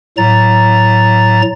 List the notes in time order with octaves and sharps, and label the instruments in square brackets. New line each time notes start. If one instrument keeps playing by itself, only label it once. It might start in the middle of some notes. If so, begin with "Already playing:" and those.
[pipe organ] A2 F#3 A#5 A6